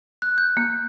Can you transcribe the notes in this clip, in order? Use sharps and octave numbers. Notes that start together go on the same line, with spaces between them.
F#6
G6
A#3